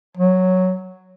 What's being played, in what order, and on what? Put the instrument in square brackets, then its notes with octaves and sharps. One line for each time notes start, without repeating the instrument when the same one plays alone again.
[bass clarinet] F#3